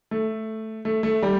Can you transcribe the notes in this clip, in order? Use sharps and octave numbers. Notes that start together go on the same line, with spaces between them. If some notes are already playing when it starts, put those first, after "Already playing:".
A3
A3
A3
G3